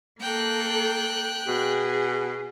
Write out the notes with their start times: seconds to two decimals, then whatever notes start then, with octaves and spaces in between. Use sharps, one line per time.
0.21 A#3 A4 G5 F#6
1.48 B2 G#4